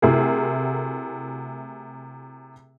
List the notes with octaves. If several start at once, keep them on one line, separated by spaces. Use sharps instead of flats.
C3 A3 E4 F#4 G#4 A#4